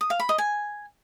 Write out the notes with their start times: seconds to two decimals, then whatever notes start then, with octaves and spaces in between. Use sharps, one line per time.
0.01 D#6
0.10 F5
0.20 B5
0.29 D#5
0.38 G#5